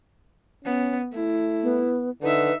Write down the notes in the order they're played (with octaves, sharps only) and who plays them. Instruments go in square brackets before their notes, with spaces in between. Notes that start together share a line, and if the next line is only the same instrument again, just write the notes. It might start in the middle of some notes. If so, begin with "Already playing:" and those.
[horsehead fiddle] B3 [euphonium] C#4
[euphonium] A3 [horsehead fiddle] E4
[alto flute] B3
[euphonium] D3 [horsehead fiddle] D#4 E5 [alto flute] B4